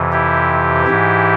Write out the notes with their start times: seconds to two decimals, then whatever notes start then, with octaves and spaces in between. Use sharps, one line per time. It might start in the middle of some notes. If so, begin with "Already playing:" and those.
Already playing: F2 C3 E3
0.12 E4 G4
0.87 G#2 E3